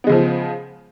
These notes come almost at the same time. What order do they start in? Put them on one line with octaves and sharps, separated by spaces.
B3 G#3 C#3 F3